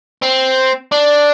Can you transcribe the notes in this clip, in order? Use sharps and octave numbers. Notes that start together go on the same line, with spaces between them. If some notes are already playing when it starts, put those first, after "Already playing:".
C4
D4